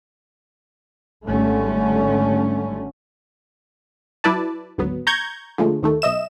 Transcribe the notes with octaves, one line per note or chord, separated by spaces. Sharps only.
G#1 D3 G3 A3 C#4
F#3 E4 B4 D5 A5
G#1 D2 F#3 B3
A#5 C#6 G6 G#6
D3 F3 G#3 A3
D#2 D#3 A3
B1 D#5 E5 E7